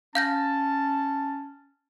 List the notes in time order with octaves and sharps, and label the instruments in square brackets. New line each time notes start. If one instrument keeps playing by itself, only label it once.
[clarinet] C#4 [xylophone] F5 G6 A#6 [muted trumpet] A5